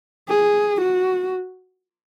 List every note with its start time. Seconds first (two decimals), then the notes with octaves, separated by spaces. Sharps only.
0.29 G#4
0.81 F#4